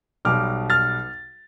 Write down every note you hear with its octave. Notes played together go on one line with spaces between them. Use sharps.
B1 B2 G3 D6 F6
F6 A6